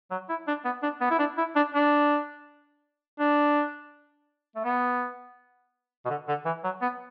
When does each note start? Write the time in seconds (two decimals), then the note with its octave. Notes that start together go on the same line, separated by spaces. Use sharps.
0.11 F#3
0.29 E4
0.48 D4
0.65 B3
0.83 D4
1.01 B3
1.11 E4
1.19 D4
1.38 E4
1.56 D4
1.74 D4
3.19 D4
4.56 A3
4.64 B3
6.05 B2
6.10 D3
6.28 D3
6.46 E3
6.64 F#3
6.82 B3